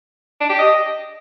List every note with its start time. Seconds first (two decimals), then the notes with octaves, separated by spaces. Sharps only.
0.40 D4
0.49 G4
0.58 D#5